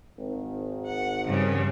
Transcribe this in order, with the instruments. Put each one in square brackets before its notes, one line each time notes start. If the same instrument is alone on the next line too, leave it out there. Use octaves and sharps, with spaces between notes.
[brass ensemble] G#1 D#3
[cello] F#5
G2 C#3